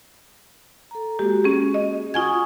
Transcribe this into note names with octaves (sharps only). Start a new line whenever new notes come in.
A4 A#5
G#3 A#3 F#4 G4
C#4 F#4 G#4
D#5
F4 F#5 G#5 C#6 D#6 G#6